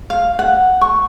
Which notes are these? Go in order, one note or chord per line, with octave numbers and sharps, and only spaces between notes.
F5
F#5
C#6